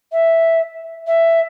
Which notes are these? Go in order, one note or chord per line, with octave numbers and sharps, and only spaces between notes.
E5
E5